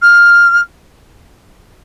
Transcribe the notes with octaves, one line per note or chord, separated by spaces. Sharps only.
F6